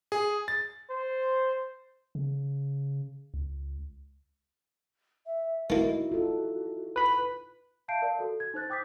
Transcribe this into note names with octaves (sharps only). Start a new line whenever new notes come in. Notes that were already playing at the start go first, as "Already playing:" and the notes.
G#4
A6
C5
C#3
C#2
E5
A3 A#3 D#4 E4 F#4
F4 A4
B4 B5
E5 F5 A5 G6 C7 D7
A#4 D5 F5 A5
F#4 A4
G#6
D#4 C5 F#6 A6
G5 D6 D#6 G6 B6